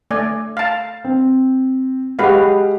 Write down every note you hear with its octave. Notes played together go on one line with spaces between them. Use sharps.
A3 D5 G#5
F5 A5
C4
G#3 F#4 G4 B4 F5